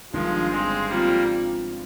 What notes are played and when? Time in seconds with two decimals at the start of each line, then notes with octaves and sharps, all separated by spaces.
0.13 G1 G2 D#3 F3 G#3
0.52 G#3 C4
0.89 G#2 F3 G3 A#3 C4 F4